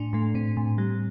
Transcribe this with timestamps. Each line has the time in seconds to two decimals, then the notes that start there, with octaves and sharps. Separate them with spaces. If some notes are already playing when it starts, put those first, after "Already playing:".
Already playing: A2 D4
0.13 A2 A3
0.34 A2 C4
0.57 A2
0.78 G3